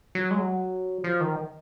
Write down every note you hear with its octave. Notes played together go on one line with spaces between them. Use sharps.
F#3
G#3
F#3
F3
D#3